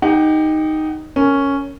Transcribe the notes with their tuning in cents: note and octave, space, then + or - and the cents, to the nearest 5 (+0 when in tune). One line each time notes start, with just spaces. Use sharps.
D#4 +0 G4 +20 F#5 +30
C#4 +0 A#4 -10